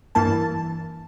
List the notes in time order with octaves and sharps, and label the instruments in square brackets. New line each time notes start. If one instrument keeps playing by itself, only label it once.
[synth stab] G2 E3 A#3 A5